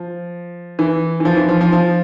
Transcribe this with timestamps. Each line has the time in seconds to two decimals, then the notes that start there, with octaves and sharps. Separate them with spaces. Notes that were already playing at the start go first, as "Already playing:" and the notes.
Already playing: F3
0.79 E3
1.20 E3
1.25 F3
1.37 E3
1.49 F3
1.61 F3
1.72 F3